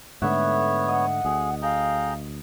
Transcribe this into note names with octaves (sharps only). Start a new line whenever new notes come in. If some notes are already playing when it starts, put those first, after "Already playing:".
G#2 D3 A3 B3 C#5 E5 F#5
D#5 F#5
D2 G#4
G#4 F5 G5 A#5